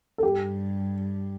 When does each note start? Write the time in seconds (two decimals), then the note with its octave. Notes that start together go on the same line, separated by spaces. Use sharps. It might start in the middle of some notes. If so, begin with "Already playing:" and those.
0.18 A4
0.23 G2 G4